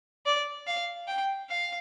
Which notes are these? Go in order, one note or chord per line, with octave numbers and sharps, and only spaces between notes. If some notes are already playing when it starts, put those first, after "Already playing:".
D5
F5
G5
F5